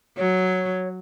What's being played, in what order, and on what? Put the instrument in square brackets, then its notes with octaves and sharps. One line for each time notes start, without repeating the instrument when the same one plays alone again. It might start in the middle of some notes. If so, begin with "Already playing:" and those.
[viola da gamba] F#3 [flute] C#5